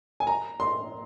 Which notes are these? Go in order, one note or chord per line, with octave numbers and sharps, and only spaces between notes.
G#5
A#5
C6